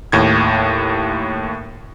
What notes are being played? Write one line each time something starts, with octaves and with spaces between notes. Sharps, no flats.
D#2 A2 G#6